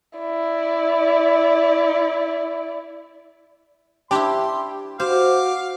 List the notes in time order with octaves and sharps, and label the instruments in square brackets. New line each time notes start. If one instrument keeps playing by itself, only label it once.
[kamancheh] E4 D5
[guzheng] D4 E4 [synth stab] G4 [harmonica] C6
[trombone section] F#4 [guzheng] C5 [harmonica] F5 D6